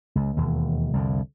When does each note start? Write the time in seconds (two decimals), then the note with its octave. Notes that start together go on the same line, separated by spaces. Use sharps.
0.15 C#2
0.37 E1 D#2
0.93 C2 F2 D3